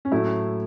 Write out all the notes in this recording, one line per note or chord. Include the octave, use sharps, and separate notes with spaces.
C#4
A2 F#3 A3 E4